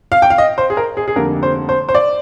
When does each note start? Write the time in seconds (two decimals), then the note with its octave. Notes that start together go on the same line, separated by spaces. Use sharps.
0.12 F5
0.22 G5
0.30 F5
0.38 D#5
0.58 C5
0.70 G#4
0.77 A#4
0.97 G#4
1.08 G#4
1.16 F1 F2 D3 G3 A#3 A#4
1.43 C5
1.69 C5
1.89 C5
1.95 D5